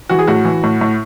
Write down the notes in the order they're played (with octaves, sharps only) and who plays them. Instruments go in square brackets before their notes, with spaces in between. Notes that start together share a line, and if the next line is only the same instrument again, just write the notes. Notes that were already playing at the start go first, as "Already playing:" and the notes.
[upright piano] E3 F#4
G#4
A2 F#4
E3
A2
A2